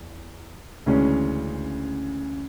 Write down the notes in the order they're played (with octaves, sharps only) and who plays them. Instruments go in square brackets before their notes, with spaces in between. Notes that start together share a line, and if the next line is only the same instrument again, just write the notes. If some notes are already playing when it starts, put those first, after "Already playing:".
Already playing: [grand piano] E2
D2 C#3 E3 G#3 C#4